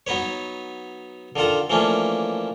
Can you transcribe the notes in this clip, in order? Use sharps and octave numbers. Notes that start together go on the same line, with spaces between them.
F#3 B3 D#4 B4 C#5
D3 D#3 F4 A4 A#5
E3 F3 A3 A#3 C#4 D4